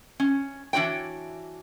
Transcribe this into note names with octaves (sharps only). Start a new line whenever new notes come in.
C#4
E3 D4 F#4 C#5 G5